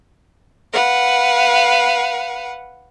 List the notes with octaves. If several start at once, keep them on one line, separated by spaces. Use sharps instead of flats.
B4 F5 F#5